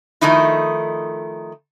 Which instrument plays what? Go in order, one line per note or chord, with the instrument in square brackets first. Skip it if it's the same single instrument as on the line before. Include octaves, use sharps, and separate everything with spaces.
[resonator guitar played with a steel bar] D#3 F3 A3 D#4 E4